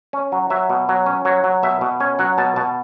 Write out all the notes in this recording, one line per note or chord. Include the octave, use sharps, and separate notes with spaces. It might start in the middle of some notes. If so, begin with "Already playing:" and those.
C#4
F#3
F#3 E5
B2
F#3
C#4
F#3 C#5
F#3
B2 E5
B2
C#4 C#5
F#3 F#5
B2 A5
B2 A5